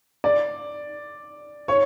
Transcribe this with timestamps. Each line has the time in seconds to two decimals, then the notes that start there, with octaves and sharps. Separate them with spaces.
0.24 D5
1.68 C#5